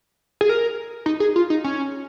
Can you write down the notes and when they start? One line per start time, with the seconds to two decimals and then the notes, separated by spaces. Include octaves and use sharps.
0.41 G#4
0.49 A#4
1.06 D#4
1.20 G#4
1.36 F4
1.50 D#4
1.64 C#4